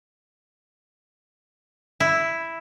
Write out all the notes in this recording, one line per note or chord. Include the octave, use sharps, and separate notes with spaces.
E4